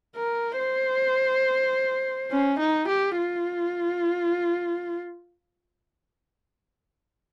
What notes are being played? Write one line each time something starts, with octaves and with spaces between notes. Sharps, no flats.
A#4
C5
C#4
D#4
G4
F4